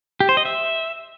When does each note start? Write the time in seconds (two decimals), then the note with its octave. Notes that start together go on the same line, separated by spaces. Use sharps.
0.20 G4
0.29 C5
0.37 D#5
0.45 E5